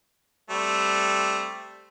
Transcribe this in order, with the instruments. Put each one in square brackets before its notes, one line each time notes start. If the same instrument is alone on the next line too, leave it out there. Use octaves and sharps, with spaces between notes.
[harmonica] G3 A3 C4